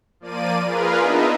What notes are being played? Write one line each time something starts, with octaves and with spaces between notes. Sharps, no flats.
F3 A#3 D5 D#7
F4 G#4 A#4 B4 F5
B3 D4 D#4 D#5 E5